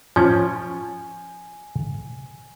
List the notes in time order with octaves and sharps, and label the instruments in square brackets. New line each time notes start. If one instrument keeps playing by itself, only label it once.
[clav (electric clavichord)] F3 C#4 [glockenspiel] G#5